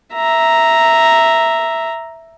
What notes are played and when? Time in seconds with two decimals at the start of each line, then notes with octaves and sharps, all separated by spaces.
0.14 E5 A#5